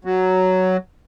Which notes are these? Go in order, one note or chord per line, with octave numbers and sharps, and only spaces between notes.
F#3